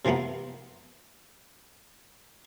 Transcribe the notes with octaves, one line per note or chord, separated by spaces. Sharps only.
C3 E3 F3 A#3 B3